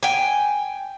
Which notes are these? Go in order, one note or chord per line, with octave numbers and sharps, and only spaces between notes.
G5 G#5